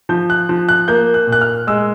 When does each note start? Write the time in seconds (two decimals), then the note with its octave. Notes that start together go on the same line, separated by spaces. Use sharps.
0.09 F3 G6
0.30 F#6
0.49 F3
0.69 F#6
0.88 A#3 G6
1.14 F#6
1.27 A#2
1.32 F#6
1.41 F6
1.67 G#3 E6